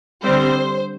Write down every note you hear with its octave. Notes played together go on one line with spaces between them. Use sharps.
D3 G3 C4 C5